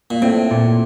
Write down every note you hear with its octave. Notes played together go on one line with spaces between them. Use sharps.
A#2
A2 C4
A#2